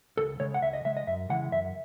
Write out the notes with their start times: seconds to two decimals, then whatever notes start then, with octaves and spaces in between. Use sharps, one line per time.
0.17 C#2 A4
0.40 C#3 G#3 C#5
0.54 F#5
0.62 C#2 E5
0.73 D#5
0.85 C#3 G#3 E5
0.97 D#5
1.07 F#2 E5
1.29 C#3 E3 G#3 F#5
1.52 F#2 E5